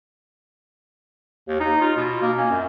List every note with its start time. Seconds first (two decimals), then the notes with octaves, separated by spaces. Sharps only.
1.48 D#2
1.60 D#4
1.81 F4
1.96 B2
2.21 A#3
2.37 C#4
2.50 F#2